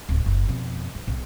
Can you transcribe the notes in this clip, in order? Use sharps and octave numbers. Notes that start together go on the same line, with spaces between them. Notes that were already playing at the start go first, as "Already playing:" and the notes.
D1
F#1
F2 B2
F#3
B1